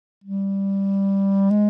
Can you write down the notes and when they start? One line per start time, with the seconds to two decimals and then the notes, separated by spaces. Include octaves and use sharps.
0.24 G3
1.51 G#3